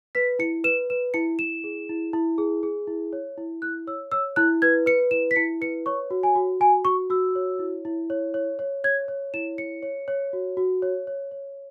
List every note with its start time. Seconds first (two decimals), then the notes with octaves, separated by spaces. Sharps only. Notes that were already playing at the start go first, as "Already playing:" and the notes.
0.15 B4 B6
0.39 E4 C#7
0.64 B4 E7
0.90 B4 E7
1.14 E4 C#7
1.39 E4 E7
1.64 G#4
1.89 E4
2.13 E4
2.38 G#4
2.63 G#4
2.87 E4
3.13 C#5
3.38 E4
3.62 E4 F#6
3.87 C#5 E6
4.12 C#5 E6
4.36 E4 F#6
4.62 B4 G#6
4.86 B4 C#7
5.11 E4 E7
5.31 B6
5.36 E4 C#7
5.61 B4 C#7
5.86 C#5 C#6
6.11 F#4
6.23 G#5
6.36 F#4
6.60 F#4 G#5
6.85 F#4 C#6
7.10 F#4 E6
7.35 C#5
7.59 E4
7.85 E4
8.10 C#5
8.34 C#5
8.59 C#5
8.84 C#5 G#6
9.08 C#5
9.34 E4 E7
9.58 C#5 C#7
9.83 C#5
10.08 C#5
10.33 F#4
10.57 F#4
10.82 C#5
11.07 C#5
11.31 C#5